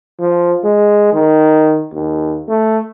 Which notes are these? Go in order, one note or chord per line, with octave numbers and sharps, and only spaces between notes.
F3
G#3
D#3
D#2
A3